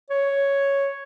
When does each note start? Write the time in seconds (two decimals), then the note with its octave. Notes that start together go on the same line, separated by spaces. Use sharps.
0.10 C#5